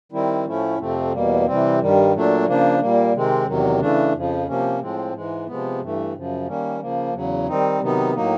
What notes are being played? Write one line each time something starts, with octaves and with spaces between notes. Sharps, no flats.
D#3 G3 C4 E4
A2 F3 A3 C#4 E4
F2 C3 F3 A3 C4
E2 B2 G3 A#3
C3 E3 G3 C4
G2 D#3 G3
A#2 F#3 A3 D4
C#3 F3 A#3 D4
A#2 G3 A#3
C3 D#3 G#3 C4
E2 C3 D#3 F#3
C#3 E3 A3 D4
F2 C#3 F3
C3 F3 A#3 C#4
A2 F3 G#3 C4
G#2 E3 G#3
C3 F3 G#3 B3
G2 E3 A3
F#2 C#3 F3
D#3 G3 A#3 C#4
C#3 F3 A#3
E2 C#3 F#3
D#3 G3 C4 D#4
C3 D#3 F#3 B3 D#4
A2 F#3 A#3 D#4